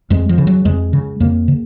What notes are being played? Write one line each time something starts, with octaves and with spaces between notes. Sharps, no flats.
F2 G#3
F3
C#3
F#3
F2 G#3
C#3
F2 A#3
C#3